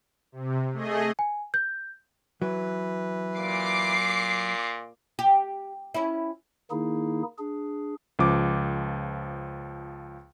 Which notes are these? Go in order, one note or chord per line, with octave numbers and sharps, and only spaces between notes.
C3
A3 G#4 D#5
G#5
G6
E3 F#3 B4
A#2 D6 C7
G4
C#4 E4
D#3 A#3 D#4 E4 G#4
D4 G#4
C#2 F3 D6